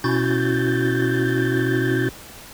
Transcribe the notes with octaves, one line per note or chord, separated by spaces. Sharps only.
B2 C#4 E4 F#4 G6 A6